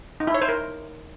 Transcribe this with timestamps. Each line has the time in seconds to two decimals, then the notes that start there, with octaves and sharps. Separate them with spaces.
0.20 D#4
0.27 E4
0.34 C#5
0.42 C5
0.49 A#4